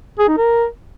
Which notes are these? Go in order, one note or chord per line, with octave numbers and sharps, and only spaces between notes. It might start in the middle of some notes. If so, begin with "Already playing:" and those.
G#4
D#4
A#4